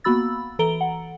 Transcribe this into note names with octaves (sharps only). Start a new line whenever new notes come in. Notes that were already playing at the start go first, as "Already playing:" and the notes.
A#3 B3 F#4 B5 E6 A6
E3 A4 A#5 D7 G7
F#5